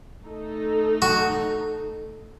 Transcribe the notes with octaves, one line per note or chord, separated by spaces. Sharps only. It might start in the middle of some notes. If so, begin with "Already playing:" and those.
A3 D#4 A4
F#4